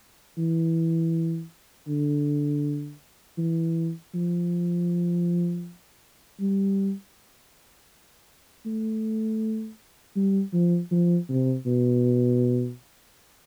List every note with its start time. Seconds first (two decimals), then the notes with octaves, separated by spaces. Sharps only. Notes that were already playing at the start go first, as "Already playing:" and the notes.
0.38 E3
1.88 D3
3.38 E3
4.14 F3
6.40 G3
8.66 A3
10.16 G3
10.53 F3
10.91 F3
11.29 C3
11.66 B2